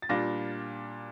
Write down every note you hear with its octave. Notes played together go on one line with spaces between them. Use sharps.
A6
A#2 G3 D4 F4 A#6